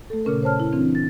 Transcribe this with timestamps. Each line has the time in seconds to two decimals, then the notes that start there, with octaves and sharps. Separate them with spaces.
0.10 A3 A4
0.25 A#2 C#3 C#4 A#4
0.43 C5 C#5 A5 F6
0.60 E4
0.72 E3 C4 D4
0.95 A6